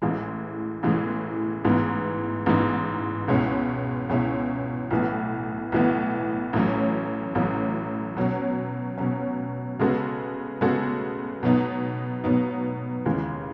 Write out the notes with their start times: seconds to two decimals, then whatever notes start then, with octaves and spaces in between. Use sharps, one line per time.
0.02 A1 A2 E3 G#3
0.83 A1 A2 E3 G#3
1.65 A1 G#2 E3 B3 D#4
2.46 A1 G#2 E3 B3 D#4
3.28 C#2 B2 G#3 C#4 E4
4.09 C#2 B2 G#3 C#4 E4
4.91 B1 A2 E3 B3
5.72 B1 A2 E3 B3
6.53 A1 A2 F#3 C#4
7.35 A1 A2 F#3 C#4
8.17 B2 F#3 C#4
8.98 B2 F#3 C#4
9.79 C#3 G#3 B3 F#4 A4
10.61 C#3 G#3 B3 F#4 A4
11.43 B2 F#3 B3 D#4
12.24 B2 F#3 B3 D#4
13.06 D#2 C#3 E3 G#3